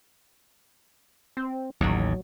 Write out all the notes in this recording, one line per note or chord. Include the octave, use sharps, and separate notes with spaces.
C4
A1 D#2 F#3